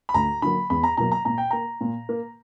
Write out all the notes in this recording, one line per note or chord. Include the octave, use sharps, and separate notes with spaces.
B5
D2 A#5
D3 F#3 A#3 B5
E2 B5
A#5
B2 F#3 A#3 A#5
A#5
A#2 A#5
G5
A#3 A#5
A#2
A#3